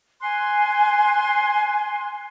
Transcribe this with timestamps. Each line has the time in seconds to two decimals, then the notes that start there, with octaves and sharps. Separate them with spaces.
0.20 G#5 C6 F#6